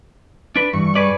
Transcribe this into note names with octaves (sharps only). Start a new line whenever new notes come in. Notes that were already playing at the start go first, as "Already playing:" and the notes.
D4 B4
G2 E3 C#6
G#4 B4 D5